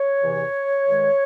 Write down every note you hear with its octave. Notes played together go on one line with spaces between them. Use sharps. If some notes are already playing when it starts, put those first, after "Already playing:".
Already playing: C#5
E2 C3 E3
G2 D#3 G#3